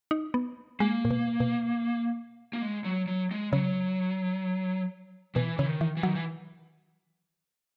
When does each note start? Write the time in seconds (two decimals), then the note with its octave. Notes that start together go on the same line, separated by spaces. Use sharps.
0.11 D#4
0.34 B3
0.80 G#3 A#3
1.05 A#2
1.10 B2
1.40 B2
2.53 A#3
2.62 G#3
2.85 F#3
3.08 F#3
3.31 G#3
3.53 C#3 F#3
5.35 B2 E3
5.58 C#3 E3
5.66 D#3
5.81 E3
5.97 E3
6.03 D#3 F#3
6.15 E3